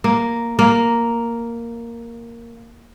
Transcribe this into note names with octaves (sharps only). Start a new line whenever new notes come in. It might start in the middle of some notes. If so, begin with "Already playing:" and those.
A#3
A#3